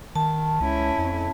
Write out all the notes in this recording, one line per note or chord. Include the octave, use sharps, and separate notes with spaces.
D#3 A5
C#2 C#4 E4
F2